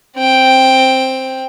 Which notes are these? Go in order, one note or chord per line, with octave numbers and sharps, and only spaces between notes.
C4 G5